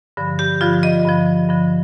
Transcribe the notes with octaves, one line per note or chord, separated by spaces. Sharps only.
G2 D3 F3
G4
G2 D3 F3 F4
D#5
G2 D3 F3
G2 D3 F3